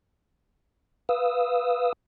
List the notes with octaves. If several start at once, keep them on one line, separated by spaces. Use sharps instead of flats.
B4 F5 D#6 E6